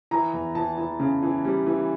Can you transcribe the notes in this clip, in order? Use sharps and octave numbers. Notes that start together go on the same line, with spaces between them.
E3 A#5
E2
E3 A5
E3
C#3
E3
G3
E3